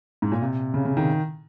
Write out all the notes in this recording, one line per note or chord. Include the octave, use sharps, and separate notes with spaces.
G#2
A#2
C3
C#3
C#3
D#3